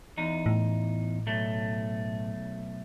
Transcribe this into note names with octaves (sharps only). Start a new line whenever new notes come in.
E2 D#4
A2
B1 A3